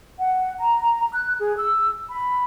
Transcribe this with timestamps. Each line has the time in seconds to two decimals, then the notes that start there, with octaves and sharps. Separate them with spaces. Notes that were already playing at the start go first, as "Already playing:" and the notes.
0.20 F#5
0.58 A#5
1.13 F#6
1.39 G#4
1.57 E6
2.09 B5